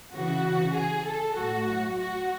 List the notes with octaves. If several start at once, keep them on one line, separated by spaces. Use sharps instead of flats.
C#3 E3 F#4
G#4
A4
A2 F#3 F#4
F#4